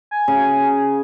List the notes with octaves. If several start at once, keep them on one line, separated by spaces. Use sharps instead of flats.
G#5
C#3